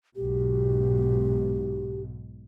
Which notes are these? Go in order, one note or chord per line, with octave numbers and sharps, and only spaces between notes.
B1 G#2 B2 G4